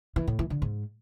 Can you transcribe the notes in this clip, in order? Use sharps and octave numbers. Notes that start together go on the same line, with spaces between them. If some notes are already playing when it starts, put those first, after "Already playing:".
E3
A2
E3
D3
G#2